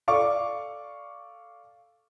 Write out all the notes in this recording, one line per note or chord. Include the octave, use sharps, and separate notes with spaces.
A4 D5 F5 C#6 D6